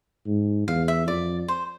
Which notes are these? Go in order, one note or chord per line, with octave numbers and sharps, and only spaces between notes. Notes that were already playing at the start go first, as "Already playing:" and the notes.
G#2
E2 F5
E5
F2 D5
C5